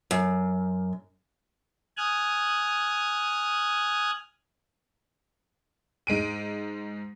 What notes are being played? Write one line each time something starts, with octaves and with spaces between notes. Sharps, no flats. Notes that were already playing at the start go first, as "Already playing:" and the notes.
F#2
G#5 D#6 F6 F#6 G#6
G#2 G#3 D7 D#7